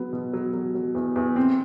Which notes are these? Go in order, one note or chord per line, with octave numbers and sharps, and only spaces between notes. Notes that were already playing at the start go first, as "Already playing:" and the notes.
Already playing: F#3 B3
B2
F#3
F#3
F#3
E2
E2
C4